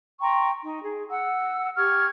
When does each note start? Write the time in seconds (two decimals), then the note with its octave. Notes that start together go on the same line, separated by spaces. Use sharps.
0.21 G5 A#5 C6 C#6
0.64 D#4
0.84 G#4
1.09 F#5 E6
1.77 G4 C#6 F6 G#6